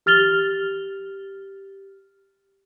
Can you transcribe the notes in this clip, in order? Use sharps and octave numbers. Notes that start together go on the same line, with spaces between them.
G4 F6 A6 F7 G7